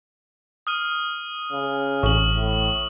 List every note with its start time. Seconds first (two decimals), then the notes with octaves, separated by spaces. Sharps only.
0.67 D#6 F6 D#7
1.53 C#3
2.03 A1 C#6 F#7
2.36 A2